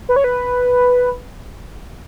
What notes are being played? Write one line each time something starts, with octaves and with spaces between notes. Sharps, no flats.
B4
C#5
B4